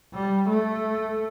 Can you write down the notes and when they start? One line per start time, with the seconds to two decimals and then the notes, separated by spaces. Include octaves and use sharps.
0.14 G3
0.49 A3